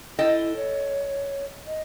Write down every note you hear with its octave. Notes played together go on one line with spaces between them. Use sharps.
E4 A4 D#5 G5
C#5
D#5